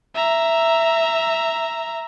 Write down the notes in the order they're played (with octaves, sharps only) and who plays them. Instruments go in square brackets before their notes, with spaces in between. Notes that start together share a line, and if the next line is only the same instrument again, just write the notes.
[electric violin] E5 A#5